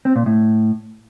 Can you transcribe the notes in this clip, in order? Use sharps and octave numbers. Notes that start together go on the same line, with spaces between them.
C4
A#2
A2